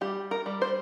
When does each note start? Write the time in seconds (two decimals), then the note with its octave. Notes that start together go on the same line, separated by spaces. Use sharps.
0.01 G3 G4
0.31 A#4
0.46 G3
0.62 C5